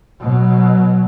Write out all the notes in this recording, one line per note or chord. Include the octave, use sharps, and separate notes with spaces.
B2 F#3